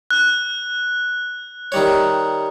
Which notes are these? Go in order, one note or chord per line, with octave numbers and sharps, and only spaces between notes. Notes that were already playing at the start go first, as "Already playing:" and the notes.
F#6
D#3 G3 C#5